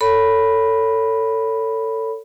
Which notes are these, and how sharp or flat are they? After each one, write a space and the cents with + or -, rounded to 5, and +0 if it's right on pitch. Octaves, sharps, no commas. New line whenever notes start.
A4 +25 C#5 +20 B5 +0